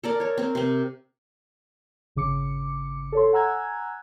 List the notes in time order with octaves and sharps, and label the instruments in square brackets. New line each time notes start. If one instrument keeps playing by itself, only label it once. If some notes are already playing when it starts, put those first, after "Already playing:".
[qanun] A4 A#4 D5
A#4 C#5
C4 A#4
C3 C4
[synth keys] G#1 C#3 D6 C#7
A4 C#5 C6
F#5 G#5 A#5 E6 F#6 G#6